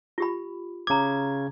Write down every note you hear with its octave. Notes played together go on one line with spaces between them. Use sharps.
F4 G4 B5
C#3 A#5 D6 G#6